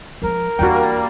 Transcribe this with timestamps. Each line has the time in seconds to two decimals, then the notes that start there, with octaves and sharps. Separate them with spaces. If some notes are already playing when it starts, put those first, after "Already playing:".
0.22 F3 G#3 A#4
0.59 E2 G3 A#3 D4 F#4 G5